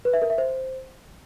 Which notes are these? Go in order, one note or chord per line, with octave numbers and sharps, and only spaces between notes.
B4
E5
A#4
E5
C5